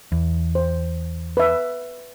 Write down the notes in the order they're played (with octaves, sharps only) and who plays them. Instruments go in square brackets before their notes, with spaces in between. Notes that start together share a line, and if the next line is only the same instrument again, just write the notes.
[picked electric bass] E2
[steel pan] C5
B4 E5